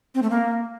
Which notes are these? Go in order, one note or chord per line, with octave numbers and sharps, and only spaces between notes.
C4
A3
A#3